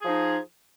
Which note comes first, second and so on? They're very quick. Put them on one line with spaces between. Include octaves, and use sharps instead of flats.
G#4 F3 D#4